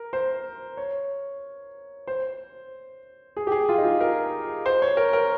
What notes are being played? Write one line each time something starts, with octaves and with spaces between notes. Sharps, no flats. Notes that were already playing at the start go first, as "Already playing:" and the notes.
Already playing: A#4
C5
C#5
C5
G#4
G4
G#4
F4
D#4
F4
A#4
C5
C#5
A#4
A#4